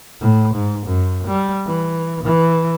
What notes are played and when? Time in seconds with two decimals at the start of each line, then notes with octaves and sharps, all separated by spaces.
0.21 A2
0.55 G#2
0.87 F#2
1.28 G3
1.67 E3
2.24 E3